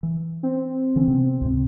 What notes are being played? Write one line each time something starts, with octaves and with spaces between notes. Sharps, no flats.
E3
C4
D3 E3 C#4
C3 B3
C#2 G#2 C3